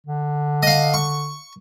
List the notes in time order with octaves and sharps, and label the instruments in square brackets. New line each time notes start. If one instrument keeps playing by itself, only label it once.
[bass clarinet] D3
[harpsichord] D#5 F5
C#6